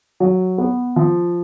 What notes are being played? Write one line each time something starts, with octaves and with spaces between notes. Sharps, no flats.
F#3
B3
F3